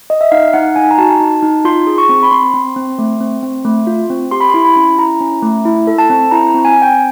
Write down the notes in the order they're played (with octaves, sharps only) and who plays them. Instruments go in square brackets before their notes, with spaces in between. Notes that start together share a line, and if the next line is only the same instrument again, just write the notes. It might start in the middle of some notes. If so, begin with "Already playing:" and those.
[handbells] D#5
E5
D#4 F5
D#4 F#5
D#4 G#5
A#5
F#4 A5
D#4
D#4
F4 C6
G#4
C#6
C4
B5
C4 C6
C4
C4
A3
C4
C4
A3
F4
C4
G4 C6
B5
E4 C6
B5
C#4
E4 A#5
C#4
A3
E4
A4
A5
C4
E4 A#5
C4
G#5
C4
G5